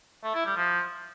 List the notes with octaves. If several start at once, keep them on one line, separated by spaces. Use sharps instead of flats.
A3
E4
G3
F3